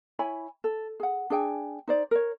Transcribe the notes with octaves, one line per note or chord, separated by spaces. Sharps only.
E4 C#5 G#5 B5
A4
G#4 F#5
D4 G#4 G5 G#5
D#4 C5 D5
A#4 C#5